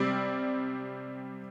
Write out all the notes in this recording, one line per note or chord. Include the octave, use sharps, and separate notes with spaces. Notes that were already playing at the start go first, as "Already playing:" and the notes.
Already playing: C3 G3 C4 G4 D5